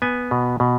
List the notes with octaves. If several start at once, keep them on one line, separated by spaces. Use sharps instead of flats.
B3 G#5
B2
B2